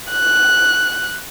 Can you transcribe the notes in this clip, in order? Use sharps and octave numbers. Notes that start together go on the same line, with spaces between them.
F#6